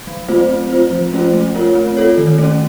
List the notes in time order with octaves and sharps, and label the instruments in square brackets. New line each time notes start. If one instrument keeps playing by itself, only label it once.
[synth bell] F#3
A3 C4 F4 C5
C4
F4 C5
F3
A3 C#4 F4 C5
A3
C4 F4 A#4 C#5
C4
F4 A4 C#5
D#3
A3 C#4